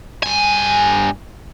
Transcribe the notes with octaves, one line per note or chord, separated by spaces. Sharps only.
G2 G#5